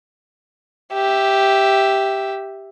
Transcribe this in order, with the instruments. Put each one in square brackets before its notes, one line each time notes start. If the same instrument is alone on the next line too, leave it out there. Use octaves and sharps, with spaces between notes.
[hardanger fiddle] G4 E5